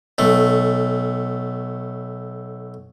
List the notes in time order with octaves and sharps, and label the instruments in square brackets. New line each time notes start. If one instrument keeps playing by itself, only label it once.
[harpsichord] B1 A3